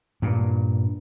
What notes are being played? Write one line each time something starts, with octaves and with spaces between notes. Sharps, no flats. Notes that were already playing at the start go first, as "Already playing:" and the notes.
G2 A#2